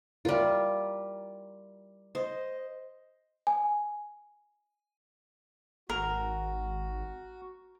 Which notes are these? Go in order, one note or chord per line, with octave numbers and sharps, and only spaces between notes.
G3 E4 F4 A#4
C5 D#5
G#5
G#1 F#4 A#4